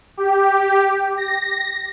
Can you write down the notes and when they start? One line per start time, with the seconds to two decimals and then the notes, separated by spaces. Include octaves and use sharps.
0.17 G4
1.17 A#6